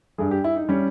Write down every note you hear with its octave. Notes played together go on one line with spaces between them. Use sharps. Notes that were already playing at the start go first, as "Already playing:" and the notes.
G2 G3 G#4
G4
E4
D#4
G3 C#4